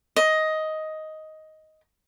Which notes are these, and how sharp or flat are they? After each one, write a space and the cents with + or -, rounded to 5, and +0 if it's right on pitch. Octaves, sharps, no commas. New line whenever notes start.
D#5 +10